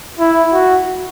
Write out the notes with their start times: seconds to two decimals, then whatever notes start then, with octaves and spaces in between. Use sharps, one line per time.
0.19 E4
0.53 F#4